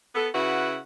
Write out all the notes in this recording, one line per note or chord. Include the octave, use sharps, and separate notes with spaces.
B3 A4
C#3 E4 F#4 B4 F#5